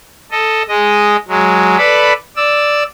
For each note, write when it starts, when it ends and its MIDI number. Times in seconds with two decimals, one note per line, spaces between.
0.31 0.63 69
0.31 0.63 75
0.68 1.16 56
0.68 1.16 75
1.28 1.77 54
1.28 1.77 56
1.77 2.13 69
1.77 2.13 71
1.77 2.13 74
1.77 2.13 83
2.36 2.83 74
2.36 2.83 88